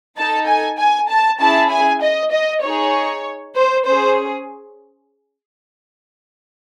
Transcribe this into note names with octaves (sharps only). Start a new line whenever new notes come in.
D#4 A4 A5
G#5
G#5
A5
C#4 E4 G#4 A5
G#5
D#5
D#5
D#4 G#4 C#5
C5
C#4 C5
G#4